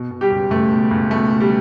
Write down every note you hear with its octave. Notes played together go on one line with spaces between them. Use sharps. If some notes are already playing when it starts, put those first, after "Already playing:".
Already playing: B2
B2
G3 G4
C#2
C#2 A3
B2
C#2
B2 A3
B2
G3